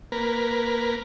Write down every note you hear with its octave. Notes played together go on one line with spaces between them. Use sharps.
A#3 A#4 B4